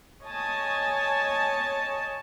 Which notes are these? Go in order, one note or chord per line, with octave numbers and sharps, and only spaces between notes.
C#5 D#5 G#5 A5